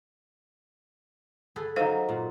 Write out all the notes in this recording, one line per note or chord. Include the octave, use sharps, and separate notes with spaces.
G#4 A4 B4
F#3 D#4 C5 E5 F5
A#2